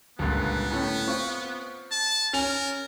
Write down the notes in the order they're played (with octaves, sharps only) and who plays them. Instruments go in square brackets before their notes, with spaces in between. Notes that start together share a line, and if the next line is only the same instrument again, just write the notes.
[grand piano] G1 C#2 A#2 [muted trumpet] B3
[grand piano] A2 A3 C#4
C4 F4 C#6
[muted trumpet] A5
[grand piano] C#4 G#5 F7 [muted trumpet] A#4